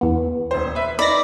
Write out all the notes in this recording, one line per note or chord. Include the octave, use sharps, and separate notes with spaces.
E2 B3
D#1 C5
B4 E5
D#4 D5 B5 A#6